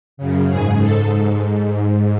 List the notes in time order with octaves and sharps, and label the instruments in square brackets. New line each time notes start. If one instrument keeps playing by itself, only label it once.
[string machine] F#2 C#3
G#2 G#4
G#2 A4